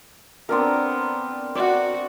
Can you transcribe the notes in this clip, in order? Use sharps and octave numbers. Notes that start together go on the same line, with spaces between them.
B3 C4 D4 A#4
F#4 D5 F#5